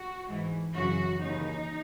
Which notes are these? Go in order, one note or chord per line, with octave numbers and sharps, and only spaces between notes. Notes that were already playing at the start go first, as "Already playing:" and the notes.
Already playing: F#4
G#2 E3
F#2 C#3 E3 F#4
D#2 C#3 E3 D#4